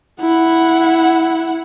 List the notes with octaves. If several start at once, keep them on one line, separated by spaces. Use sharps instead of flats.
E4 F#5